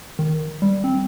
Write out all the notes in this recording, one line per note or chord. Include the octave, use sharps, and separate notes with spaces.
D#3
G3
C4